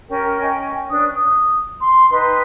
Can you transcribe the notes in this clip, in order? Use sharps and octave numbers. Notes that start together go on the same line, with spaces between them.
C#4 G4 A#4
C#4 D#5 G5 G#5
C#4 D4 B4 D#6
D#6
C6
D#4 B4 G5 C6